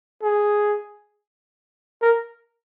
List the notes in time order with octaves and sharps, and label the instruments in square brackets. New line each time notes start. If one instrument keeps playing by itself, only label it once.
[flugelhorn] G#4
A#4